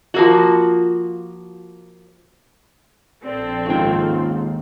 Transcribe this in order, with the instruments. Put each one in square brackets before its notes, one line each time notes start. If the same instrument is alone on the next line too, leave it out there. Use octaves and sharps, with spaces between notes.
[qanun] F3 A#3 F#4
[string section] A#1 C4 A4 [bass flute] D5
[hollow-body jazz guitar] D#2 G5 [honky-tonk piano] G#2 C#3 [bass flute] F4